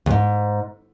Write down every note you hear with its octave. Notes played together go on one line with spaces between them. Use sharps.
D#2 G#2